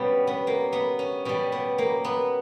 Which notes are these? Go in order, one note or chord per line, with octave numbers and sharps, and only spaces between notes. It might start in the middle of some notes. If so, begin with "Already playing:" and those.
Already playing: B2 G3 B3 C#4
B3
A#3
B3
C#4
B2 G3 C#4
B3
A#3
B3